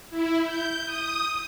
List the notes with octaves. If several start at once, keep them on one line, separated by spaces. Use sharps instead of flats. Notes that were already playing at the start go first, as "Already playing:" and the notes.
E4
G6
D#6